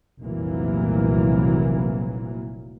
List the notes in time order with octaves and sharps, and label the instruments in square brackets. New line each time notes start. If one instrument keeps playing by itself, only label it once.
[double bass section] F1 C2 A#2 E3 F#3 A#3